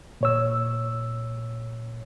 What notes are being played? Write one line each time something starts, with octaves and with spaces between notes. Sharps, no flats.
A#2 C#5 E6